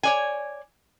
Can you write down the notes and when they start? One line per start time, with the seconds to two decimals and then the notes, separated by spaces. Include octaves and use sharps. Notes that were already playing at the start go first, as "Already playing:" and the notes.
0.03 C#5 D5 G#5